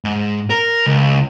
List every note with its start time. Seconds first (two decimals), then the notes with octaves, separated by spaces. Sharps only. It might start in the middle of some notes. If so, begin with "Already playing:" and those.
0.05 G#2
0.50 A#4
0.87 C#2